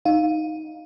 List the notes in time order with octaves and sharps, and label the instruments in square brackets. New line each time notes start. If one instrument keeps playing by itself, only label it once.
[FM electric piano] D#4 [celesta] F5